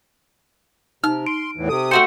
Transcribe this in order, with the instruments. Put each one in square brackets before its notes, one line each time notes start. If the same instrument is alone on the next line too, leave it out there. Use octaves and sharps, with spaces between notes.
[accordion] C3 [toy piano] D#4 [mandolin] F6
[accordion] C6 [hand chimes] D7
[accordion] E2 A2 E3
[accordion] C3 D#6 [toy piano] A4
[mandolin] A3 F#4 C5 [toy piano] G5 [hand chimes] C#7